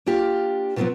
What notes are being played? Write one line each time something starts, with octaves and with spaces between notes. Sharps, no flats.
A#3 D4 F4 G4
B2 D3 F3 F#3 B3 C4